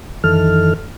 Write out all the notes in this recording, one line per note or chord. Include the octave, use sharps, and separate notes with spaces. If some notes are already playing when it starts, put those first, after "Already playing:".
F#2 D#3 E3 A4 F6